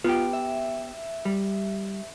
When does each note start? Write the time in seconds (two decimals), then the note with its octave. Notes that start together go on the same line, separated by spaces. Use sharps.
0.04 B3 F4 G4
0.33 E5
1.25 G3